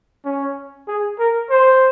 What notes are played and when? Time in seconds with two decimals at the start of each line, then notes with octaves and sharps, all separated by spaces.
0.25 C#4
0.88 G#4
1.19 A#4
1.50 C5